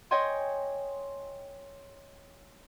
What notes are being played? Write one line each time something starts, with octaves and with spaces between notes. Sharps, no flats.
C#5 D#5 G5 G#5 C6